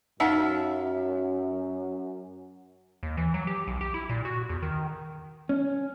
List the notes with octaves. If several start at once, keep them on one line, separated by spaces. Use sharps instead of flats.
F#2 D#4 F4 E5 F#5 A5
D#2
E3
F#3
G4
B1
G4
E4
A#2
F#4
E2
D#3
C#4